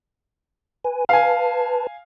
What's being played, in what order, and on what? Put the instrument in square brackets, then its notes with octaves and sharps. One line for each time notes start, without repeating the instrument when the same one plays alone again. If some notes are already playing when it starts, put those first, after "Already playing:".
[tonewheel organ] B4 G#5
[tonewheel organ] B4 A5 [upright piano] F5 G#5